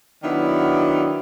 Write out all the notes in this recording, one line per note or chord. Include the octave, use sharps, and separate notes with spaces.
D#3 F#3 B3 D4 E4